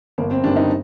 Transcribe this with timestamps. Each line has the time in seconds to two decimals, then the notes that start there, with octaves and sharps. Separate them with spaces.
0.18 G1 A#3
0.31 C4
0.44 G2 D#3 G3 D4
0.56 D#4